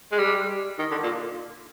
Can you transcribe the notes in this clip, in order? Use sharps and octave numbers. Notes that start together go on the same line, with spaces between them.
G#3
G3
D#3
D3
A#2